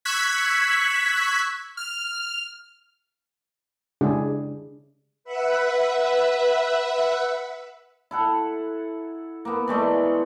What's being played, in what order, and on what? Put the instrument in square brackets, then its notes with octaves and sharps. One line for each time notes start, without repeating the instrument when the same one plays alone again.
[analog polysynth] C#6 E6 F#6 G#6 B6
F6
[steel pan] C#3 G#3 D4 E4 G4 G#4
[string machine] B4 E5 F#5
[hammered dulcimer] E4 A4 F#5
A#3 B3
E3 G#3 A3 D5